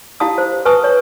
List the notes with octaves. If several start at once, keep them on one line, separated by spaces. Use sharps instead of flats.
E4 G4 F5 A5 D#6
C5
B4 G#5 A5 C#6 D#6
C#5